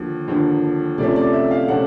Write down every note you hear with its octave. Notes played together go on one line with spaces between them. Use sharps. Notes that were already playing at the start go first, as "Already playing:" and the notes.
Already playing: D#2 D3 F3
D#2 D3 F3
C3 F3 A3 C#4 D5
D5
E5
F5
C3 F3 A3 C#4 F#5